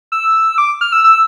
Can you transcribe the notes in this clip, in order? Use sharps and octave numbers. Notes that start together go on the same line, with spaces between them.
E6
D6
F6
E6
E6